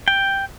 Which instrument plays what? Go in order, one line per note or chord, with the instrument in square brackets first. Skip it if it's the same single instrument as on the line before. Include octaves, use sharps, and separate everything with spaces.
[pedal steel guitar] G5